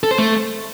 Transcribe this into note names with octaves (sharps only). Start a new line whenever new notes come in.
A4
C5
A3